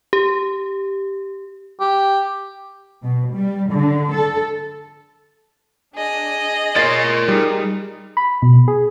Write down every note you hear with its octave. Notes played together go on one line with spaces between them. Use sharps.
G4
G4
B2
G3
D3
A4
D4 G#4 D#5
A#4 C#5 D5 C6 A6 C7
G3 D#4 G#4
B5
B2
G#4